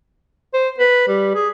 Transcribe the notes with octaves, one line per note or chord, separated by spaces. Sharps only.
C5
B4
G3
G#4